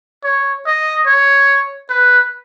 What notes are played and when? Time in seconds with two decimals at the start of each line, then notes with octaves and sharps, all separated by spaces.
0.24 C#5
0.66 D#5
1.06 C#5
1.90 B4